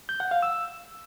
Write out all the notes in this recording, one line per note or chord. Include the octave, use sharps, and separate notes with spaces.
G6
F#5
F5
E6